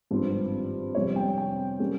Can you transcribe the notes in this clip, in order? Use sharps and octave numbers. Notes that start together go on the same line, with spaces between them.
G#1 G2 F3 C4
F2 C3 G3 C4 C#5
G5
G5
G3 A#3 C#4